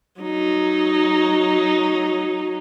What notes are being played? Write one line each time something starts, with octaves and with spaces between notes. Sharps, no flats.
F#3 D#4